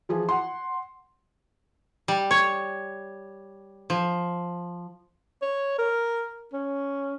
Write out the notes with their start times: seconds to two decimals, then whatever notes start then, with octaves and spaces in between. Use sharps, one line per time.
0.09 E3 F3 G#4
0.29 F#5 C6
2.08 G3
2.31 C#5
3.90 F3
5.42 C#5
5.79 A#4
6.53 C#4